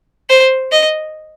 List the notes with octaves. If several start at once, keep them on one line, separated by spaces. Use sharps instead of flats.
C5
D#5